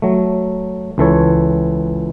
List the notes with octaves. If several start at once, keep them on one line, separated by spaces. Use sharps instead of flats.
F#3 A3
C#2 E3 A4 C#5